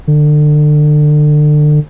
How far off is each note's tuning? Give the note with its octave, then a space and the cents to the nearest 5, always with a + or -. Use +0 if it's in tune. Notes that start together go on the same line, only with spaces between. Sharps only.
D3 +30